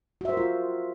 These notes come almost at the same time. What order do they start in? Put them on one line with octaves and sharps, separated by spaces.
F#4 E5 C5 A#4 F4